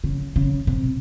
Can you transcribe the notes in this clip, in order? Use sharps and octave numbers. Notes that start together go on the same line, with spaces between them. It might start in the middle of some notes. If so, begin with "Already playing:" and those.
C#3
C#3
C3